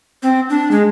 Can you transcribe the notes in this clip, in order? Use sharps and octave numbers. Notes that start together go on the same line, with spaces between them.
C4
D4
G#3